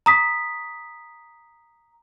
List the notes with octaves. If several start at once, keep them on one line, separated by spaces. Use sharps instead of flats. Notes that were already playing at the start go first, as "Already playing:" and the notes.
A#5 D#6 B6